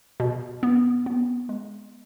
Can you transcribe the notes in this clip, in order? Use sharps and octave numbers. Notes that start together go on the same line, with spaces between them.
B2
B3
B3
G#3